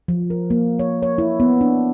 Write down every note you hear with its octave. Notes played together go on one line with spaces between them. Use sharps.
F3
A#4
A#3
C#5
C#5
E4
B3
D4